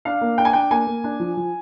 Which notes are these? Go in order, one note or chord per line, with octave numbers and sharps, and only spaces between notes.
D4 F5
A#3
D4 G5
G#5
D4 G5
A#3 G#5
A#3
D4
F3
F3